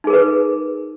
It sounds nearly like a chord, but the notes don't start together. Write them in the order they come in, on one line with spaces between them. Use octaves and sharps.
D#4 G#4 A#4 B4